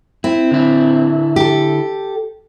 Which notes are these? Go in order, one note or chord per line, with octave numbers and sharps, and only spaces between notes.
C4 E4
D3 E4
G4 A4